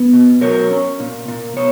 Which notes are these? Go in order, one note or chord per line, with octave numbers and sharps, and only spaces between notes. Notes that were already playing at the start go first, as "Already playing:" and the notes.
Already playing: B3
B2
F#3 A#4 C#5
C#4
A#2
A#2
B2 C#5